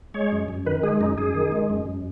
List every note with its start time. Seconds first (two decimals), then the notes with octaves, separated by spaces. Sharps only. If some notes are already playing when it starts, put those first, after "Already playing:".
0.14 G#3 C#5
0.32 F#2
0.49 F#2
0.66 D#3 B4
0.83 G#3 G#4
1.00 F#2 D#4
1.17 F#2 G#4
1.34 D#3
1.52 G#3
1.70 F#2
1.86 F#2